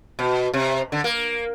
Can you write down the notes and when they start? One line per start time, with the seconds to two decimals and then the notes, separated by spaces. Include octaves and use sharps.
0.19 B2
0.54 C3
0.92 D3
1.04 A#3